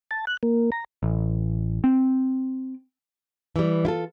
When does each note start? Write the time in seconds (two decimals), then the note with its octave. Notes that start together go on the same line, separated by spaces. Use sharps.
0.11 A5
0.27 F#6
0.43 A#3
0.72 A#5
1.03 A1
1.84 C4
3.56 E3 G3
3.85 E4 F4 A4